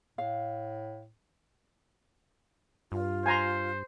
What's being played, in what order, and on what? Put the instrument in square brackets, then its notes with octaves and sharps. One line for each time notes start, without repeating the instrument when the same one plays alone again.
[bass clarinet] A2 [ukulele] F5
[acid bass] G2 [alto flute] F4
[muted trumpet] C5 [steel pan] G#5 A#5 C6